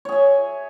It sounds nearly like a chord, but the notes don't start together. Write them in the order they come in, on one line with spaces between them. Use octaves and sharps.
C#5 G#4 E5